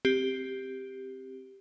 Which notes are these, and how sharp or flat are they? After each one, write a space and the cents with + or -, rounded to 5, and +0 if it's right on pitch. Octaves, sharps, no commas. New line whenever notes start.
C4 +5 G4 +0